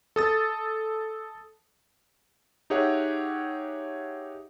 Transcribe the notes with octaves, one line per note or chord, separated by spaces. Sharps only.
A4 D#6 A6
D#4 G4 G#4 C#5 E5 F#5